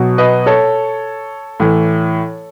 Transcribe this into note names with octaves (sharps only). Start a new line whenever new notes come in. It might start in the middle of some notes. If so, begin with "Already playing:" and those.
Already playing: B2 F#3
B4 D#5
A4 C#5
A2 E3